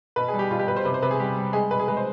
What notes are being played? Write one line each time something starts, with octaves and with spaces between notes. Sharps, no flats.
B2 B4
G#4
G3
G4
B2 F4
G4
B2 B4
C5
C3 B4
C5
C3 B4
G#4
G3 G4
G3
G#3 G#4
B2 B4
G#4
G#3 B4
C5